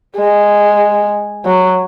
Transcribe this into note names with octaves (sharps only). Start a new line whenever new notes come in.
G#3
F#3